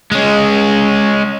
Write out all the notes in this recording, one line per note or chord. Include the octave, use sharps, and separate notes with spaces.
G#3 C#4